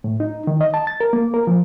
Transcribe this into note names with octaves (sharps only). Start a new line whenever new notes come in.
A2
D#4
D#3
D#5
A5
A6
A#4
A#3
A#4
F3